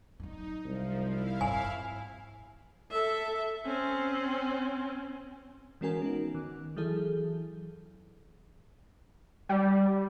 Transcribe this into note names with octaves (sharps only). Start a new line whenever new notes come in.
F#3 D4 D#4
C2 F3
E4 F5
G#1 F#2 G#5
A4 E5
C4 C#4
E3 G#3 C#4 F#4 A#4 G#5
B3 D#4
D#3
E3 F#3 E4 G#4 A4
G3